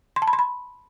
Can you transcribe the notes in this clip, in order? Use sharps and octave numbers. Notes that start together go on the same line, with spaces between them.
C6
A5
B5
C6
B5